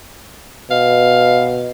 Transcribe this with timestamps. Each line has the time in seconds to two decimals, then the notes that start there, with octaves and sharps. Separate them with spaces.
0.71 B2 F5